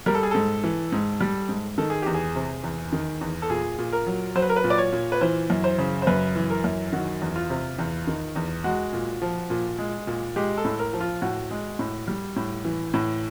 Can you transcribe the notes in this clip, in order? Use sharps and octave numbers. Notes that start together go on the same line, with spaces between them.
G3 A#4
A4
G#4
G#2 A4
E3
G#2
G3
G#2
D#3 A4
G#4
E2 G4
G#4
C3
E2
D#3
E2
A4
A#2 G#4
A#2
A#4
F#3
F#3 C5
B4
A#4
B4
A#2
D5
C#5
A#2
B4
E3 C5
F#2
C5
C#3
C5
F#2 B4
E3
A#4
F#2
D#3 F#4
E2
F4
C3
E2
D#3
E2
G#3 F#4
A#2
F3
A#2
G#3
A#2
G#3 G4
A4
A2
A#4
F3
F4
A2 F#4
G#3
A2
G3
A2
E3
A2